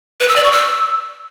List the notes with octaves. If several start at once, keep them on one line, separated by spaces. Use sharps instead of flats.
B4
E6
D5
C#6
E6